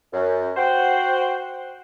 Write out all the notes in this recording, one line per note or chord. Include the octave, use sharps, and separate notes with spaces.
F#2
F#4 C5 F#5 G5